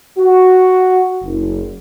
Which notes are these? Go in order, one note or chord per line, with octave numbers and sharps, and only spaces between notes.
F#4
F#1